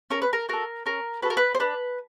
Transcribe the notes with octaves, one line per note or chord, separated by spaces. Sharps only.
C#4 A#4
B4
A#4
F#4 A4 A#4
C#4 A#4
F#4 A4 B4
A#4
B4
C5
D4 B4